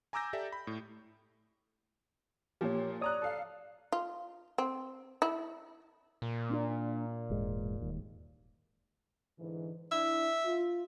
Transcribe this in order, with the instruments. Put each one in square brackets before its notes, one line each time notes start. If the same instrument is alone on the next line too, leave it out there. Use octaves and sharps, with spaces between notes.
[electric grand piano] G#5 A#5 D6 E6 G6 A#6
G4 A4 D5 E5
B5
A2
[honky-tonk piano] A#2 F3 [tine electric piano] G4 C#5
[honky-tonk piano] C#5 A#5 F#6 [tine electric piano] D5 D#6
[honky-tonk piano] A4 F5
[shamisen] F4
C4
E4
[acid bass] A#2
[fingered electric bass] A#3 C4 D4
E1 G#2 G#3
D#1 D#2
[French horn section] G#2 D3 E3
[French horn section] D4 E4 [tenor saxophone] E5
[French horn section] F4